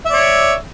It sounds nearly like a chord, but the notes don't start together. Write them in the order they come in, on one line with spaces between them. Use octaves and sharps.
E5 D5 C#5